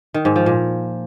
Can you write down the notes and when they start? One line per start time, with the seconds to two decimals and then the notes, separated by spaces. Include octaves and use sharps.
0.14 D#3
0.25 G#2
0.36 F3
0.46 A#2